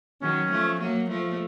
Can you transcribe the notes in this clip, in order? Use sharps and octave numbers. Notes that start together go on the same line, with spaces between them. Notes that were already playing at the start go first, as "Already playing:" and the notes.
D#3 F#3 C#4
F3 A3
F#3 A#3
F3 A3